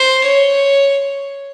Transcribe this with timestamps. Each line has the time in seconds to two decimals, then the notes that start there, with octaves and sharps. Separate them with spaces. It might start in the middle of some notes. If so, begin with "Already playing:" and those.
Already playing: C5
0.24 C#5